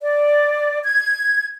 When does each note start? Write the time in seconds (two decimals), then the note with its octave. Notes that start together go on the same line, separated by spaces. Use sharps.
0.01 D5
0.84 G#6